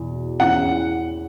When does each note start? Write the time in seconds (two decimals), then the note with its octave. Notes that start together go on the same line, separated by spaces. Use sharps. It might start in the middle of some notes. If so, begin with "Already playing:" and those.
Already playing: E2 B2
0.40 E2 E3 C#4 E4 F#5